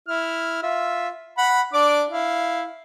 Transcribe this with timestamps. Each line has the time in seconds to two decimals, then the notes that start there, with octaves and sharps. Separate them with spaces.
0.08 E4 F6
0.63 F4 E5
1.38 F#5 B5
1.73 D4 D5 D6
2.10 E4 F5